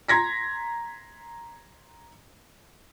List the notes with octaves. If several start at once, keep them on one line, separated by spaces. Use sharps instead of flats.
A#5 C6 G#6 A#6 B6